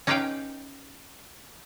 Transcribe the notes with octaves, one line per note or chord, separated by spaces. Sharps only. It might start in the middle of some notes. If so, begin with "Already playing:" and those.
C#4 D#4 G4 B4 F5 G5